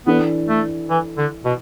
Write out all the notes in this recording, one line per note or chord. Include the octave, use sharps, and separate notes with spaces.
E3 B3 D4 A4
A3
E3
D3
B2